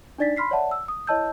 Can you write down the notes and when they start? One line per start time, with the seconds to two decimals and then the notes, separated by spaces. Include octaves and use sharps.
0.18 D4 D#4 D5 A6 B6
0.37 B5 C6 F6 B6 C7
0.51 C#5 D5 E5 F#5 A5
0.71 E6
0.88 D#6
1.07 E4 C#5 D#5 A5 E6 G6